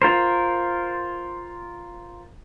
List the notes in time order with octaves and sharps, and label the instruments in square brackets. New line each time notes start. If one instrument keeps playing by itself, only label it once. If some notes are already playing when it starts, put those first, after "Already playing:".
[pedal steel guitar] F4 A#4 C5